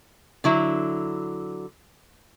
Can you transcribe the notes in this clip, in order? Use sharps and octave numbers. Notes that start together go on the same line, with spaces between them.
D3 F#3 E4